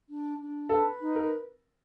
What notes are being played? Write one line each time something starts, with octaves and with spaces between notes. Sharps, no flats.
D4
D4
A4 B4
D#4
A#4